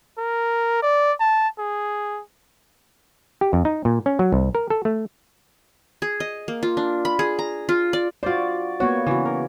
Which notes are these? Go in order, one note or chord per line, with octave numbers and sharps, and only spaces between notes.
A#4
D5
A5
G#4
G4
F2
D#4
A#2
C#4
F#3
C2
A#4
A4
A3
G#4
D#5
A#3
F4
D4
B5
G#4
A#5
F4
D5
F4 F#4 C5 D5
A#3 B3 F#4 C#5
C#3 E3 F#4
A#4